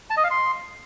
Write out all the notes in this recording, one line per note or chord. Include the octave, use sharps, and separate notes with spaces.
A5
D#5
F5
C6